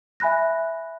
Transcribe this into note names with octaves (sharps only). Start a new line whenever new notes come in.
E5 G#5 B5 F#6 A#6